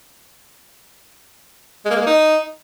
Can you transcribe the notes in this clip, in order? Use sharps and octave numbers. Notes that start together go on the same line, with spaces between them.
G#3
A#3
G#3
A#3
D#4